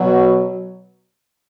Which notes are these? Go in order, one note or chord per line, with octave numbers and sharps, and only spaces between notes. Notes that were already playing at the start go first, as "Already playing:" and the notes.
Already playing: B2 F#3